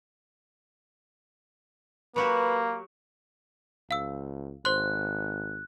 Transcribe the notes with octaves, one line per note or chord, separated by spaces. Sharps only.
F#3 A#3 F#4 G4 B4
C#2 F5 E6
G#1 C5 C6 F#6